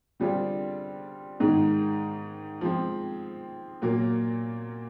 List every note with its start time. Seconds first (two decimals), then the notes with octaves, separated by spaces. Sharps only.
0.20 D3 G3 C4 F4 G#4
1.40 G#2 D#3 G#3
2.61 F3 G#3 C4
3.82 A#2 F#3 A#3